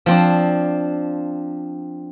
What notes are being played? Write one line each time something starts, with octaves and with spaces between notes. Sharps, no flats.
F3 C4 D4